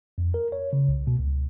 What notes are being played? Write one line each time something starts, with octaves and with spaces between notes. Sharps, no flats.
F2
A#4
C#5
C#3
C2
B2
C#2